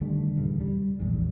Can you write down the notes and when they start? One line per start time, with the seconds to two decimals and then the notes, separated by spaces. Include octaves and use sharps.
0.01 D3 D#3 G3 A3
0.36 D#1 E2 G2 C#3
0.60 G3
1.00 A#1 E2 G#2